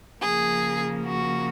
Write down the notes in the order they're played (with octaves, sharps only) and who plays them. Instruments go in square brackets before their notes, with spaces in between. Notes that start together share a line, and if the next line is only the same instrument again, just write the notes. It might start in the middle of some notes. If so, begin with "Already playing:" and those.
[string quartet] C#3 F3 A#3 G#4
F#4